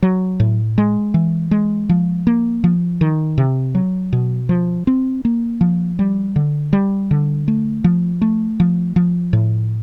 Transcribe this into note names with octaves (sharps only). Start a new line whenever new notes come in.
F#3
A2
G#3
E3
G#3
F3
A#3
F3
D#3
C3
F#3
B2
F3
C4
A#3
F3
G3
D3
G3
D3
A3
F3
A3
F3
F3
A2